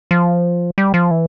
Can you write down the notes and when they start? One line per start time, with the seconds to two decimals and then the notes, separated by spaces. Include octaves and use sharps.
0.11 F3
0.78 G3
0.94 F3
1.11 E3